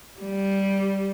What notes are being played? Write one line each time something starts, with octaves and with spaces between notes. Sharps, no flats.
G3